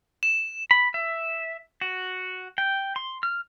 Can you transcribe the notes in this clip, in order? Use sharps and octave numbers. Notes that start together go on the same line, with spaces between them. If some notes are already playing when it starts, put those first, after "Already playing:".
E7
B5
E5
F#4
G5
C6
F6